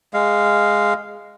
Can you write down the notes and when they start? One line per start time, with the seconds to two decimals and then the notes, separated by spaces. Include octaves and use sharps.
0.14 G#3 F5